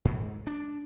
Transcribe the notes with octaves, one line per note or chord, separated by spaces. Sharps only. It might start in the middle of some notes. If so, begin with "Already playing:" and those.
G#2
D4